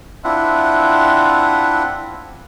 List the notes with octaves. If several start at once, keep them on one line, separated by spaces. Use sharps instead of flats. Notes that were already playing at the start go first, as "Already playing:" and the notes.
C4 D4 E4 F4 E5 F#5